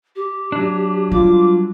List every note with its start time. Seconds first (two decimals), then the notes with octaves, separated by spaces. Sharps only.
0.16 G4
0.52 F#3 D4
1.12 G3 F4 D6